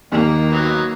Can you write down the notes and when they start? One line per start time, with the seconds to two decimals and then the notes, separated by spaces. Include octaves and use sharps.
0.12 D#2 D#3 A#3
0.52 F#3 B3